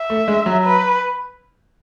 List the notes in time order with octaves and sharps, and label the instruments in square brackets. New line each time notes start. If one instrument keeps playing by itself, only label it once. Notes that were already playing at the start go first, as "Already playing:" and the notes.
Already playing: [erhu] E5
[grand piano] A3
G#3
F#3
[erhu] B4